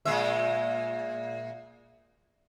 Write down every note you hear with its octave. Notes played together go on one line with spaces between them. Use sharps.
A#2 G#3 E5